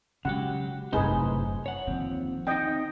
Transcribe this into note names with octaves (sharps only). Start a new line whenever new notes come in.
C#3 F#3 G#3 G4 F#5
F#1 F#2 A2 C3 D#4 G#4 B4 C5
C#5 F#5
D#2 D3 F3 C4
C4 D#4 D#5 G5